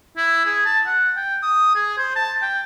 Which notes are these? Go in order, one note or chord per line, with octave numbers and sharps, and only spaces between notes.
E4
G#4
A5
F#5
G5
D#6
G#4
C5
A5
G5